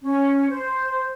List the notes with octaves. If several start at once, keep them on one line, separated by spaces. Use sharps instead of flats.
C#4
C5